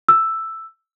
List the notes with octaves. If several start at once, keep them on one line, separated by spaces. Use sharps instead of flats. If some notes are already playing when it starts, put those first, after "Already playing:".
E6